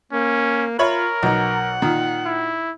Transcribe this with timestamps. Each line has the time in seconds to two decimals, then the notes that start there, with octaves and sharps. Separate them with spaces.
0.12 A#3 C#4
0.79 F4 A#4 C#5 E5 B5
1.23 B1 D#4 F#5
1.82 A#2 D#3
2.26 E4